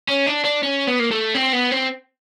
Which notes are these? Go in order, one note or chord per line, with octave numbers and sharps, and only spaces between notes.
C#4
D4
D4
C#4
B3
A#3
A3
C4
B3
C4